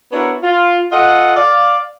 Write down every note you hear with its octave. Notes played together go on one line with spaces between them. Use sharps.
B3 D4 E4 F#4 A#4 C#5
F4
F4 A4 D#5 F#5
D5 F5